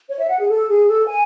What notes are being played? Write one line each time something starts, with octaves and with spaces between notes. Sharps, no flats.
C#5
E5
F#5
G#4
A4
G#4
A4
G#5